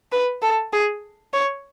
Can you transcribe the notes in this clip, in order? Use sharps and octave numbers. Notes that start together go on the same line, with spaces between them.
B4
A4
G#4
C#5